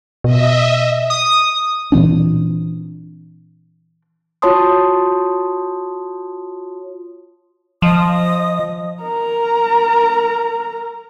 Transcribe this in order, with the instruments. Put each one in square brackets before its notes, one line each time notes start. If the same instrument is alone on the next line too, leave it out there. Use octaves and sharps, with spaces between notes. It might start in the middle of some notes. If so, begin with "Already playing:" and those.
[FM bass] B2 [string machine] D#5 E5
[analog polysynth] D#6
[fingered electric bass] A#2 E3 C4 D4
[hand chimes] F4 F#4 C#5 A5 C6 D#6
[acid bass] F3 [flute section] D#5 D#6
[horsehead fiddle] A#4 A#5